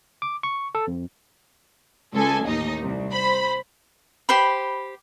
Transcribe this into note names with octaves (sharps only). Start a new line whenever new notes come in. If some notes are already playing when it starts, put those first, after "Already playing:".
D6
C#6
A4
F2
C#2 A4 G#5
A1 D#2 D#4 D#5
C2
C5 B5
G4 C5 B5